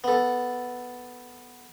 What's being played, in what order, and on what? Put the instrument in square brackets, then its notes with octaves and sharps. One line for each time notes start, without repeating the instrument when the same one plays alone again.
[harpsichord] B3 A4